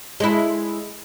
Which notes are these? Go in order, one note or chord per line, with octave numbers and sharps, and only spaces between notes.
G#3 E4